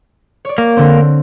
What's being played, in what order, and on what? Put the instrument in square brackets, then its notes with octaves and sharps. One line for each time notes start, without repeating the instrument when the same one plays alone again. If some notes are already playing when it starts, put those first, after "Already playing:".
[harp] C#5 D5
[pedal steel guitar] A#3
[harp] D3 C4